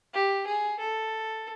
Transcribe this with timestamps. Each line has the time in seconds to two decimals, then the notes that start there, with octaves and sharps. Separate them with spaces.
0.14 G4
0.47 G#4
0.79 A4